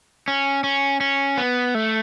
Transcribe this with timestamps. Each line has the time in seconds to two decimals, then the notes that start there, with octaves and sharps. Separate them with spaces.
0.28 C#4
0.64 C#4
1.01 C#4
1.37 B3
1.75 A3